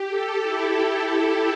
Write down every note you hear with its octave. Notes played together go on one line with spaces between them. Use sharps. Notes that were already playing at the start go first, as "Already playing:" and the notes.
Already playing: G4
A4
E4